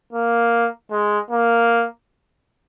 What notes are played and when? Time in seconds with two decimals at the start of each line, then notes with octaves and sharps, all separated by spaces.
0.13 A#3
0.91 G#3
1.31 A#3